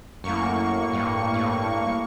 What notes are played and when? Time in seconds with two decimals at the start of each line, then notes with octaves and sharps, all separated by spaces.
0.24 F#2 A2 A#3 C#6
0.93 G2
1.34 G2